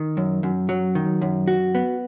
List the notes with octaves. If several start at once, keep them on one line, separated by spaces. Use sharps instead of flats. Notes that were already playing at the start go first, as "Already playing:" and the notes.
Already playing: D#3
F#2
F#2
F#3
D#3
F#2
F#4
B3